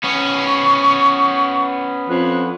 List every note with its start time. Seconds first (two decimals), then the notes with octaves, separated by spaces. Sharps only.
0.04 B3 C#4 C#6
2.09 F2 F#6